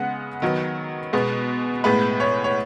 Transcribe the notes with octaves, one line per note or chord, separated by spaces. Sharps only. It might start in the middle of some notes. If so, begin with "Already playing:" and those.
Already playing: C#3 G#3 B3 F#5
D#3 F#3 B3
B2 G#3 B3
A2 G#3 B3 B4
C#5
C#5